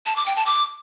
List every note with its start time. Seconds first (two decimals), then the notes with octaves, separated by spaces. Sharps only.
0.06 A5
0.16 D6
0.26 G5
0.36 A5
0.46 D6